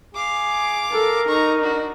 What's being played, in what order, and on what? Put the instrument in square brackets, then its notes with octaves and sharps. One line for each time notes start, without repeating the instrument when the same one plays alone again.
[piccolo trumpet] G#4 [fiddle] F5 D6
[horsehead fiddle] A4 [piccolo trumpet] A#4
[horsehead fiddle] D#4 [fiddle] A#5 C#6
[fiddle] D4 F#4